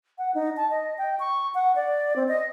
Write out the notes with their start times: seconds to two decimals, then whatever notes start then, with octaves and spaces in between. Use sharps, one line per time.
0.18 F#5
0.35 D#4
0.57 A5
0.71 D#5
0.98 G5
1.20 C#6
1.55 F#5
1.76 D5
2.16 C4
2.28 D#5